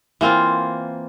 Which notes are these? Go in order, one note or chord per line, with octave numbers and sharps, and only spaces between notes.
E3 A#3 C4 F4